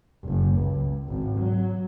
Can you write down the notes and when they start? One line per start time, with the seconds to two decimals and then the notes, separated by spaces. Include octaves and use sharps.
0.24 F#1
0.56 C#2
1.08 G#1
1.39 F#3